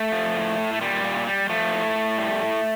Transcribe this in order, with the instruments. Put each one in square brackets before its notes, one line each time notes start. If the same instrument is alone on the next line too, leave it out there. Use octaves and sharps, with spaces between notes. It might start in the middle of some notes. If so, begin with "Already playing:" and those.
Already playing: [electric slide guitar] A3
F3
A2
A2
A3
A#2 G3
A#2
G3
F3 A3
A2
A2
G3
A2